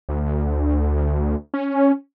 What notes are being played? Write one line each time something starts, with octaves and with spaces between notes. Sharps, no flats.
D2
C#4